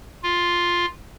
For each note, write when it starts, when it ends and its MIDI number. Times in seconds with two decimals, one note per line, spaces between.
0.23 0.86 65